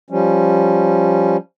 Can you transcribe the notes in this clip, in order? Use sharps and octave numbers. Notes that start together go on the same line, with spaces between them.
F3 G3 C#4